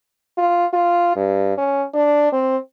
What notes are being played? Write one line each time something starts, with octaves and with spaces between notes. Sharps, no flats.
F4
F4
G2
C#4
D4
C4